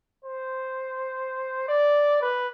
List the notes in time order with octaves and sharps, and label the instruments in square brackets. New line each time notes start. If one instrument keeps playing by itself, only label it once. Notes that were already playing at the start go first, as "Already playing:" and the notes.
[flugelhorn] C5
D5
B4